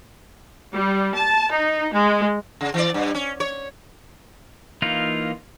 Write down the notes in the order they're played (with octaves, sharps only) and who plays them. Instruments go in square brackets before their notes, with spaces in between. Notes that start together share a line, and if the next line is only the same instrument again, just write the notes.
[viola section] G3
A5
D#4
G#3
[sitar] C#3
E3 D5
G2
C#4
C#5
[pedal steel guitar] E3 A#3 D#4 F4